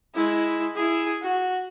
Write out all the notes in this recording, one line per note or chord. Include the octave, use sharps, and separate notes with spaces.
G#3 E4
E4 G#4
F#4